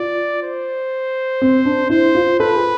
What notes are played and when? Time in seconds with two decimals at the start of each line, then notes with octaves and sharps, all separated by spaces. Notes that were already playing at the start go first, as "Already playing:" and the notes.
Already playing: F4 D5
0.43 C5
1.42 C4
1.65 D4
1.90 E4 C5
2.15 F4
2.39 A4 B4
2.55 G#4